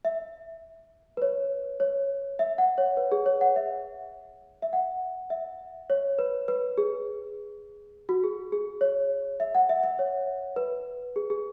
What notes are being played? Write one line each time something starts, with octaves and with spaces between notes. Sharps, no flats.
E5
B4
C#5
C#5
E5
F#5
C#5
B4
G#4
C#5
F#5
E5
E5
F#5
E5
C#5
B4
B4
G#4
F#4
G#4
G#4
C#5
E5
F#5
E5
E5
C#5
B4
G#4
G#4